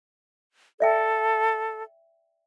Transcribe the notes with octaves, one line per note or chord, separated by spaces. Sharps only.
A4 D5 E5 G5